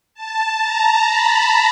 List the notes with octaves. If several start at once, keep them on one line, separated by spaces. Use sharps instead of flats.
A5
A#5
B5